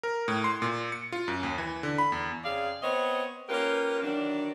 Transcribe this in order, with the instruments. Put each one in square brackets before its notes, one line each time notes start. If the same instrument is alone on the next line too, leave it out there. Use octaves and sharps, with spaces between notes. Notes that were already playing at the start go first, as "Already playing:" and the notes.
[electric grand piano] A#4
A2
C6
A#2
C#7
F4
F#2
D#2
E3
D3
B5
E2
[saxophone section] F2 C#3 G#4 D5 F5
B3 C4 C#5 D#5
A#3 C#4 F4 G4 A#4 B4
D#3 E3 F#3 D4